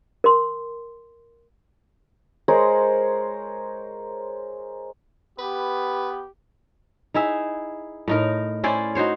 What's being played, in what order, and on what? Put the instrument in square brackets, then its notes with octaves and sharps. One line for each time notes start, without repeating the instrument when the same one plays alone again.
[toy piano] A#4 C6
[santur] G#3 A#4 C5 C#5
[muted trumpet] B3 [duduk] G4 [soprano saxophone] B4
[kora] D#4 E4 G#4 E5
A2 D#4 A#4
C#4 E4 C5 D5
D#4 F#4 C5 C#5